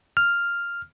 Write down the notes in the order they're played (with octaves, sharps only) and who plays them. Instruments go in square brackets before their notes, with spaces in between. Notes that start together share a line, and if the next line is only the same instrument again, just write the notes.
[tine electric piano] F6